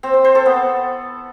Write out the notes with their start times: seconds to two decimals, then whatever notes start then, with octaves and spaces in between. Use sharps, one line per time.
0.03 C4
0.14 C5
0.24 C5
0.35 A4
0.46 B3